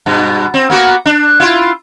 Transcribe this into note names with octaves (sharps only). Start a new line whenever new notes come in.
G2 B2
C4
A#3 B3 F#4
D4
E4 F4